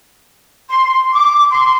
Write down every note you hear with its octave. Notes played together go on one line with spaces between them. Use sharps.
C6
D6
C6